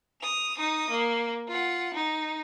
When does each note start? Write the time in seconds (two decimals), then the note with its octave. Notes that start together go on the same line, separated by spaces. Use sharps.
0.21 D#6 F7
0.57 D#4 D#6
0.90 A#3
1.48 F4 F#5
1.94 D#4